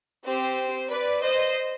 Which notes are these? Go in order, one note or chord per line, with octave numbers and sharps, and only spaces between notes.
C4 G4 C5
B4 D5
C5 D#5